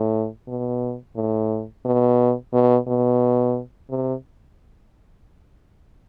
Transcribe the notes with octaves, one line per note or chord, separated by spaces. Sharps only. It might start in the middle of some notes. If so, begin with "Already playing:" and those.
Already playing: A2
B2
A2
B2
B2
B2
C3